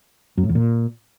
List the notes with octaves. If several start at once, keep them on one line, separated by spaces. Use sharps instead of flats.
F#2
A2
E2
A#2